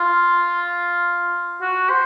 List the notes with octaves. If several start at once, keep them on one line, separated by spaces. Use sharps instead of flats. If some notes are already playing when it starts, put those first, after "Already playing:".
Already playing: F4
F#4
C5